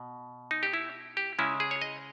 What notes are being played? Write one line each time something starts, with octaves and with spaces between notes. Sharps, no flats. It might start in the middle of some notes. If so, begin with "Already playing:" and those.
Already playing: B2
D#4
G4
E4
G4
C#3 G#3 C#4 E4
G#4
C#5
D#5